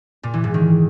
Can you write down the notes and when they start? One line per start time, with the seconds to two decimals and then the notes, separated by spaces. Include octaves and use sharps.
0.23 A#2
0.34 E3
0.44 G#2
0.54 D#3